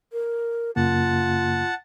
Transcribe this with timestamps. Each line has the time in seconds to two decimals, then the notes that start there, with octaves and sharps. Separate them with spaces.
0.13 A#4
0.76 F#2 C#3 A#3 F4 F#5 A5